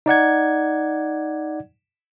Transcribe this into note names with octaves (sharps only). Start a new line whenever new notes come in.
D#4 D5 F#5 G#6